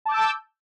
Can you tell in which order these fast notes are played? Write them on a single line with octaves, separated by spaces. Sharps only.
A5 D6 G6 E6